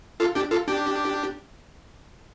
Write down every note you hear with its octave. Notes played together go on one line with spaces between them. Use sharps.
F4 A4
D4 G4
F4 A4
D4 G4